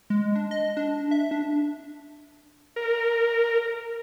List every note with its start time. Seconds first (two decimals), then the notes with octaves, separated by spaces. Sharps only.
0.10 G#3
0.36 D4
0.51 D#5
0.77 D4
1.11 E5
1.31 D4
2.76 A#4